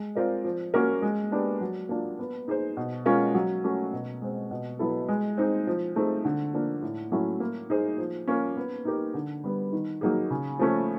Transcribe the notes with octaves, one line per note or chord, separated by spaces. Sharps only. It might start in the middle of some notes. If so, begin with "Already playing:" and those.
Already playing: G#3
C4 F4 A#4 D5
F3
A#3 C#4 F#4 A#4
G#3
B3 D4 G4
F#3
A#3 D4 F4
B3
D#4 G#4 C5
B2
G#3 C#4 F4 A#4
F#3
A3 C#4 F#4
B2
G#3 C4
B2
F#3 B3 E4 A4
G#3
C4 D#4 G#4
F3
A3 C4 D#4 G#4
D3
F3 A#3 D4
A2
F#3 A3 C#4 E4
A#3
D#4 G#4 C5
F3
A#3 C#4 F4
B3
D#4 G4 A#4
D3
G3 B3
D#3
F#3 A#3 D#4 G#4
C#3
F3 A3 C#4